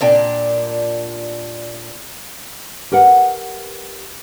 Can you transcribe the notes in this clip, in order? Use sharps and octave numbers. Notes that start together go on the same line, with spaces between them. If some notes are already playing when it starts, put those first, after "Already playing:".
A#2 D4 G4
G4 A#4 B4 F#5